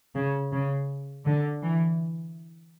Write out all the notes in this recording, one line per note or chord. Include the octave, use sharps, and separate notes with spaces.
C#3
C#3
D3
E3